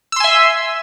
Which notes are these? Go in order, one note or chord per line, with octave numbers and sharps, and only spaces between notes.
E5 G#5 C6 E6